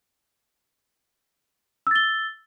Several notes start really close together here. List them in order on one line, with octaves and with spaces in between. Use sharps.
E6 A6 G7